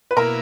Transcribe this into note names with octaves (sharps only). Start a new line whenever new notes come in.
B4
B2 A#3 E4 A#4